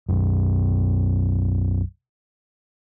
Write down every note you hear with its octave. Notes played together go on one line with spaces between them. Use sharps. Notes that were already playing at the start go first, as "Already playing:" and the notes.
B1 F#2